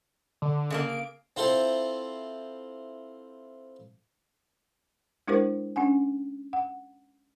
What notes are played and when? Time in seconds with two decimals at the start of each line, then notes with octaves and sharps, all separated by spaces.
0.42 D3
0.70 C#3 A3 A#3
0.89 D7
1.36 C4 E4 F4 A4 C5
5.28 G#3 D4 E4 G4 A#4 C5
5.76 C#4 D4 F#5 G#5
6.53 F#5